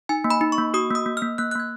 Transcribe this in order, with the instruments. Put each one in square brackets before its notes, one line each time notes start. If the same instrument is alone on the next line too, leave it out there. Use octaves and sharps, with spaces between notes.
[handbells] D#4 G#5
A#3
B5
D#4
C#6
A#3
F#4 D#6
A#3 D#6
A#3
A#3 F6
A#3 F#6
F#6
A#3 G#6